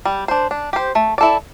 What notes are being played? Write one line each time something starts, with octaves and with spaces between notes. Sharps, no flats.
G3
D4 C5
D4
G4 C5
A3
E4 A4 D5